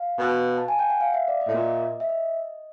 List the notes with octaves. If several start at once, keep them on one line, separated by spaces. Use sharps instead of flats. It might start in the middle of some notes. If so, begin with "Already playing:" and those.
Already playing: F5
B2
A5
G#5
G5
F#5
F5
E5
D5
D#5
A2 E5
A#2 D#5
E5
D#5